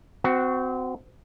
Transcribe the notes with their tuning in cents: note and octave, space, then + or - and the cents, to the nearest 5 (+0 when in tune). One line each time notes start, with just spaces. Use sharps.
C4 -25 F#4 +0